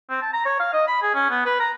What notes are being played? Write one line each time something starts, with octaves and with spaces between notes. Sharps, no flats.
C4
A5
A#5
C#5
F5
D#5
B5
G#4
C#4
B3
B4
A#5